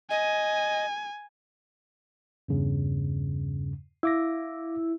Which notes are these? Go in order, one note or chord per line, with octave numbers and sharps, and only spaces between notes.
D#5 G#5
E2 G2 C#3
E4 F5 D6 A#6